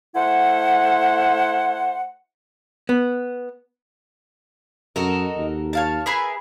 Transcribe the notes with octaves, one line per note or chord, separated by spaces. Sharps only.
A3 E4 C5 F#5
B3
F#2 F#4 A4 A#4 D#5
D#2
C#5 F5 A5
E4 G#4 A#4 B4 G#5